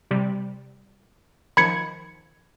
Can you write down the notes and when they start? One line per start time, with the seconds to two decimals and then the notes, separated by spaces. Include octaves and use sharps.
0.11 C3 G3
1.57 D#3 F3 B5 G#6 C#7